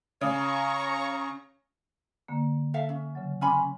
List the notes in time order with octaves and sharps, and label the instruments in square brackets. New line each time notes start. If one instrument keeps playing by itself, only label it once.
[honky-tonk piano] C#3 [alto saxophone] C#5 [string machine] A#5 C#6
[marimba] D3 A#3
[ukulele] A4 E5 F5
C#4
[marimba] C#3 F#3
[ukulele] C#4 G#5 B5 [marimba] C6 D6 F6